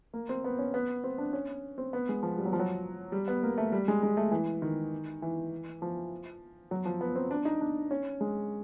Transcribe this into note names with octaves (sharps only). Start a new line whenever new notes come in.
A#3
C4
B3
C#4
B3
C4
D4
C#4
C4
B3
G#3
F3
G3
F#3
F3
F#3
G3
B3
A#3
A3
G3
G#3
G#3
A3
E3
D#3
E3
F3
F#3
F3
B3
C4
D4
D#4
D4
C#4
G#3